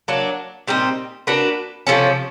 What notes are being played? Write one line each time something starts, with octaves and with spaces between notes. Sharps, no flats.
F#3 A#3 D4
A#2 G3 C4 D#4
A#3 D4 F#4 B4
C3 F3 A3 C#4